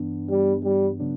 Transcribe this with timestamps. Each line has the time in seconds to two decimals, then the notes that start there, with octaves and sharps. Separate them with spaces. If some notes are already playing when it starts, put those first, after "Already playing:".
Already playing: G2 E3 B3 D4
0.30 G3
0.64 G3
1.00 C#3 F#3 B3 D4